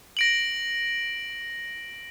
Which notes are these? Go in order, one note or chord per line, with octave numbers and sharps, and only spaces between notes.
A#6 D7 F#7